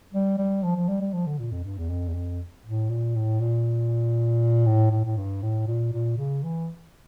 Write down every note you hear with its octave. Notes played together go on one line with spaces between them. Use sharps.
G3
G3
F3
F3
G3
G3
F3
D3
A#2
F2
G2
E2
F2
E2
F2
A2
A#2
A2
A#2
A2
A2
A2
G2
A2
A#2
A#2
C#3
E3